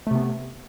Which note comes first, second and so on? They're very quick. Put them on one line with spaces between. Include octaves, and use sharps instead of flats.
A3 C3 B3